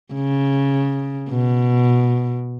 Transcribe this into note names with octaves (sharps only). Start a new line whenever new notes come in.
C#3
B2